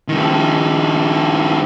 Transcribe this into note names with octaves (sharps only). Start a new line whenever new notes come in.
G2 D#3